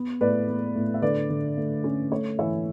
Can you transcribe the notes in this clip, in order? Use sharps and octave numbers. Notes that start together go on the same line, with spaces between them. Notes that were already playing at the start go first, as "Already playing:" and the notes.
Already playing: B3
A2 B4 D5
B3
A2
E5
D3 B4 D5
D3
A3
C#4
A3 C#5
E3 C#5 E5